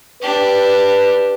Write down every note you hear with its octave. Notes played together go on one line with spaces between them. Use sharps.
D4 G4 B4